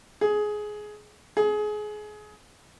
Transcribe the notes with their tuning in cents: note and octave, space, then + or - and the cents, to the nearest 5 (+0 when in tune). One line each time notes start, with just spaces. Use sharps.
G#4 +15
G#4 +25